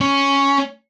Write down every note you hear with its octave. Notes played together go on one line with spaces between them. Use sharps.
C#4